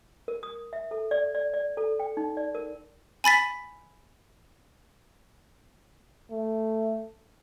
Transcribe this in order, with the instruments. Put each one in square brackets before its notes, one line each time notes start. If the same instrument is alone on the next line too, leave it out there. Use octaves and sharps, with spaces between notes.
[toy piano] A#4
D#6
E5
A4
D5
D5
D5
A4
G5
D#4
D5
A#4
[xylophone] G#5 B5 A6 B6
[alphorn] A3